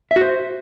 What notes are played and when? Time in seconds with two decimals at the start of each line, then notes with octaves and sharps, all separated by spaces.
0.11 E5
0.16 F#4
0.21 C5